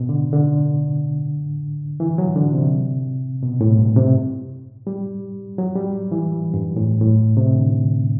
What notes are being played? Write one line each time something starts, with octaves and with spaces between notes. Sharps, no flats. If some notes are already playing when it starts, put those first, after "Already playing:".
Already playing: B2
D3
D3
E3
F#3
D3
C3
B2
A2
G2
C3
G3
F#3
G3
E3
G2
A2
A2
C3
D3